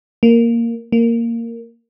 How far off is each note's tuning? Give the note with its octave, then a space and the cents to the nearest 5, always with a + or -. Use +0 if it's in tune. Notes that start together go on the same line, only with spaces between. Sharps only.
A#3 -5
A#3 -10